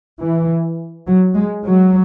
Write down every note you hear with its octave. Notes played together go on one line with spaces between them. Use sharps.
E3
F#3
G#3
F#3